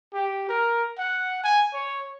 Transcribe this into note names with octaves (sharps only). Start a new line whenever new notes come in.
G4
A#4
F#5
G#5
C#5